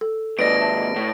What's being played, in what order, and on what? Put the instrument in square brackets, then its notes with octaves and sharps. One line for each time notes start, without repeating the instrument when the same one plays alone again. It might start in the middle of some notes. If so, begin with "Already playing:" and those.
[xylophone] A4
[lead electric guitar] D#2 G#2 [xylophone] B4 D5 [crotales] A#6 D7
[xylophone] E5 A5
[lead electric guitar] A2